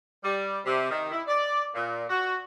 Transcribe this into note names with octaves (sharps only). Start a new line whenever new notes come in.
G3
C3
D#3
E4
D5
A#2
F#4